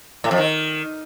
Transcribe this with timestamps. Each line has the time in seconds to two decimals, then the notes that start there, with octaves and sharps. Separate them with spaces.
0.24 A2
0.31 F2
0.38 D#3